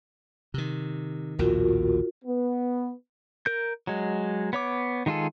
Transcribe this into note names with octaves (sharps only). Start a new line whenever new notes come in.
C3 D#3
A#1 D#2 A2 F4 F#4 A#4
B3
A#4 G6
F#3 G#3
B3 C#5 D6
D#3 G#3 F4 G#4 A4